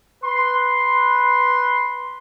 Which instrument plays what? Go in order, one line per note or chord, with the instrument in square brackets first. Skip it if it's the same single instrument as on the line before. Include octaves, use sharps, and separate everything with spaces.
[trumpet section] B4 C6